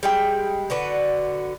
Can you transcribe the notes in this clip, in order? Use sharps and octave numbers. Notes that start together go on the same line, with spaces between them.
G3 G#3 G5
D3 F#4 B4